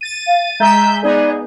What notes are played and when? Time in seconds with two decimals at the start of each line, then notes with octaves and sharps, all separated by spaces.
0.01 A6 D#7
0.26 F5
0.60 G#3 E5 A#5 G6
1.03 B3 D#4 G#4 D5